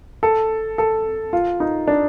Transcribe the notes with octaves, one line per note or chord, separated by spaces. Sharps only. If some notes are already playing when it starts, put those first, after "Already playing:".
A4
A4
F4
D#4
D4